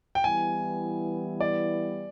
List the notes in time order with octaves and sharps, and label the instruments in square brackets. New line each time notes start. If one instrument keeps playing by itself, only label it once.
[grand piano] G5
[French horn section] E3 G3 B3 E4 [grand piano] G#5
[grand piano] D5